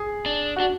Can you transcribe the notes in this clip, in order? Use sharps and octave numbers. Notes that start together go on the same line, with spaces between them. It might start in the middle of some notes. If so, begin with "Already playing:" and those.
Already playing: G#4
D4
F#4
D4